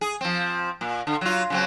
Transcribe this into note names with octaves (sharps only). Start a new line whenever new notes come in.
G#4
F3 C4
A#2
D3
F#3 F4
C#3 F#3 C4